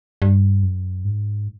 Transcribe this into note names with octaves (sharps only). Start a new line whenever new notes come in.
G2
F#2
G#2